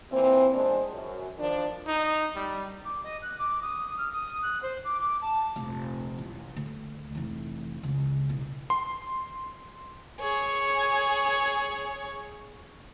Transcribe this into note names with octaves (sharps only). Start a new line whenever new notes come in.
A#2 E3 C4
E2 G#3 D4 C5
F#2
D#3 F3 D4
D#4
G3
D6
D#5
F#6
D6
D#6
F6
D#6
F#6
C5
D6
D6
A5
F1 A#1
A1
D2
F1 E3
C#2
B1 E4
C6
G#4 C#5